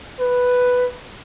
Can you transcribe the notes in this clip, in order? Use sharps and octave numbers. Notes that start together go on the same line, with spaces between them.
B4